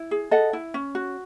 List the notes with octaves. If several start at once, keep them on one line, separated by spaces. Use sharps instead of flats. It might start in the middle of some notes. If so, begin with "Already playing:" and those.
Already playing: E4
G#4
A4 D#5 F#5
E4
C#4
F#4